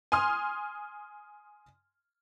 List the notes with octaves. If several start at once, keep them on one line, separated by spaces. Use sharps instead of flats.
G#5 C6 D#6 F6